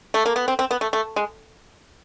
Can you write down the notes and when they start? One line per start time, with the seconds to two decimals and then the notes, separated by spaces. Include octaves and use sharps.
0.14 A3
0.26 A#3
0.36 B3
0.48 C4
0.59 C4
0.71 B3
0.81 A3
0.93 A3
1.16 G#3